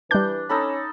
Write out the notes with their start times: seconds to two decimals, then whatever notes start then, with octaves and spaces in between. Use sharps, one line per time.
0.11 E3 G3 D4 G6
0.49 C#4 D#4 A4 B5